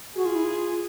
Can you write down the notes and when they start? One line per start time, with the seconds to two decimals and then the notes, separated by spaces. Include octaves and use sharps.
0.16 F#4 G#4
0.25 F4
0.35 E4
0.44 F4